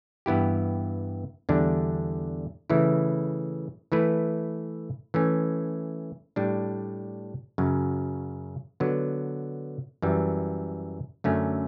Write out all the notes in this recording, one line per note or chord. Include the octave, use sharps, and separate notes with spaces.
G2 E3 B3 E4 G4
E2 D3 G3 D4
C#3 E3 A3 E4
E3 A3 E4 B4
E3 A3 C#4
A2 G3 D4
F#2 C#3 F#3
D3 F#3 B3
F#2 E3 G3
F#2 D3 A3 C#4